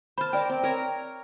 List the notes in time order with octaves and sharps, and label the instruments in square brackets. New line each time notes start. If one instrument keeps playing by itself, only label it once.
[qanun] C5 A5 [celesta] B5 F6
[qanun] A#4 D6 [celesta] D5 G5
[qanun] C4
A#4 C#5 A#5